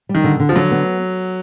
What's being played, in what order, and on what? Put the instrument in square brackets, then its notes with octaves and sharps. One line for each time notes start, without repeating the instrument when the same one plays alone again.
[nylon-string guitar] G3
[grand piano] D#3
[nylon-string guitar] D3
D3
[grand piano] F3
[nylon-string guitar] D3 [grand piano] F#3
[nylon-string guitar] B3